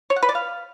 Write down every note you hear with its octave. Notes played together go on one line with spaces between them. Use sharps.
C#5
F#5
B4
D5
F5